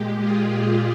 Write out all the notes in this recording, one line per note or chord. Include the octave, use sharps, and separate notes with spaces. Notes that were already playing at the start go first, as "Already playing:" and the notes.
Already playing: A#2 G#3 G4
F4 G#4